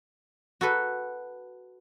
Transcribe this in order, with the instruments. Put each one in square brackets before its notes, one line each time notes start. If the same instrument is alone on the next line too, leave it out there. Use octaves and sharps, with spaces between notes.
[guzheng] F#4 A4 B4